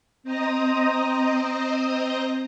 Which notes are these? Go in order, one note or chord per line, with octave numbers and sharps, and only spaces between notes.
C4 C5 D#5 A#5 D#6